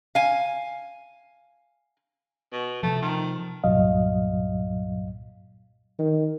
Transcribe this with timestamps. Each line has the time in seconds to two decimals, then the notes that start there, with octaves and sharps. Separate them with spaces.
0.15 F5 G#5
2.52 B2
2.83 C3 F3 A3
3.02 D#3
3.64 C2 G2 A#2 F#3 D#5 F5
5.99 D#3